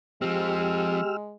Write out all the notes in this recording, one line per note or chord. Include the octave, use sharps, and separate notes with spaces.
F3 G#3 C4 G4 E6 F6